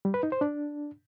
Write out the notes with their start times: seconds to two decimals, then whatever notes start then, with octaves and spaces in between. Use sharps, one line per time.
0.05 G3
0.14 B4
0.23 D#4
0.32 C5
0.41 D4